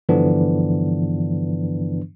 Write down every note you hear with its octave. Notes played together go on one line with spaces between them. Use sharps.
G2 D3 E3 F3 B3 D4